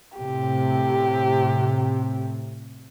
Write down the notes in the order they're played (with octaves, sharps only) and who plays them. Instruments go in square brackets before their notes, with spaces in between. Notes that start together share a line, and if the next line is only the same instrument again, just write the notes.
[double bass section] A2 C3 [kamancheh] G4